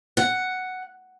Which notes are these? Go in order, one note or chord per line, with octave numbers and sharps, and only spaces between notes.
F#5